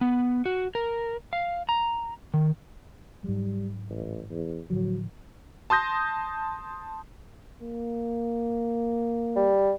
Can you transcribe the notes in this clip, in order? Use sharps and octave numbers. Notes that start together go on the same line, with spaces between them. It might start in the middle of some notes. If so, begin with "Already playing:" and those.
B3
F#4
A#4
F5
A#5
D#3
G#2 F#3 G3
A1
E2
A2 D3 F3 F#3
A5 C6 D#6 G6 A#6
A#3
G3